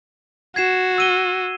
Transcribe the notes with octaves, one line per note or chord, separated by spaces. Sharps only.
F#4 G#6 C7 E7
E6 D#7 G7